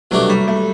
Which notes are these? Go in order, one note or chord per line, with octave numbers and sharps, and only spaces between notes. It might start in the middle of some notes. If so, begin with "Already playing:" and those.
C2 B2 F#3 A3 D4 G4
G3
A3